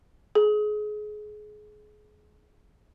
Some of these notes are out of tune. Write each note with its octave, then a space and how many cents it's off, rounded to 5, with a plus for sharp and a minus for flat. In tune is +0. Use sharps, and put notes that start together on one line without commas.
G#4 +25